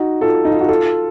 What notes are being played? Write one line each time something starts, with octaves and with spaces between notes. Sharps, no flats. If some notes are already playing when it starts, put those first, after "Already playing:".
Already playing: D#4 F#4
F4 A4
D#4
F4
F#4
F4 A4